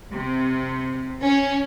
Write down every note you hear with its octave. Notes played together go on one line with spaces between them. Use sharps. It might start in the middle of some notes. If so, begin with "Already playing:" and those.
C3
C#4